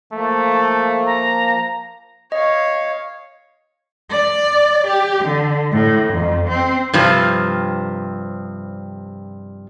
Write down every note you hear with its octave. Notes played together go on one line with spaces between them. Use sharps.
F3 A3 A#3
A#5
C#5 D#5 F5
D5
G4
D3
A2
F2
C4
G2 C3 F3